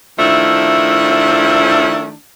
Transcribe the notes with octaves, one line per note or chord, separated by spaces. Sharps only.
D#3 F3 A3 D4 E4